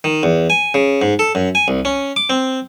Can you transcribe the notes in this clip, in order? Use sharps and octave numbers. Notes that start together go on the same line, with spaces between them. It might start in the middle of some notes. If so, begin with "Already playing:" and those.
D#3
E2
G#5
C#3
G#2
A4
F#2
G#5
C2
C#4
D6
C4